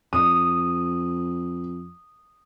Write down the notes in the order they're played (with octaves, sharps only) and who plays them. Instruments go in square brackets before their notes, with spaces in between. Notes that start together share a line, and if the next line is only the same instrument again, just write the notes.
[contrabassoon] F2 [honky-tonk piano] D#6